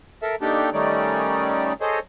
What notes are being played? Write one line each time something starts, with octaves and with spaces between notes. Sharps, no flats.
A4 A#4 E5
A3 A#3 D4 D#4 G4 A4
D#3 G3 A3 C#4 D#4 D5
G#4 A4 C5 C#5 D#5